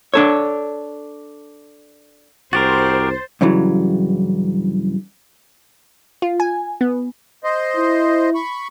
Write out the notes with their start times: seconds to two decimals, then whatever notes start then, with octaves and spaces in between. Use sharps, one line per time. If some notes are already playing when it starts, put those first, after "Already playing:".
0.14 D4 A4 C#5
2.53 C2 F#4 G4 A#4 C5 A6
3.41 G2 C#3 E3 F#3
6.22 F4
6.40 G#5
6.81 B3
7.44 C5 D#5
7.77 E4
8.35 B5 C#6